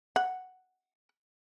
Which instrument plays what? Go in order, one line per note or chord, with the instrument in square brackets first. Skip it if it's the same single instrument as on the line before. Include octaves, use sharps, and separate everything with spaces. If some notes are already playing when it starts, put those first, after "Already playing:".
[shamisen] F#5